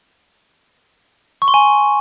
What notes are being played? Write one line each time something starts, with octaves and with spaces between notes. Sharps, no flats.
C#6
C6
G#5